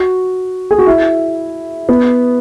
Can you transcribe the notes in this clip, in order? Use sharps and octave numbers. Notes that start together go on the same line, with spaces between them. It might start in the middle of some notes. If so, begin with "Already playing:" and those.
Already playing: F#4
G#4
F#4
E4
B3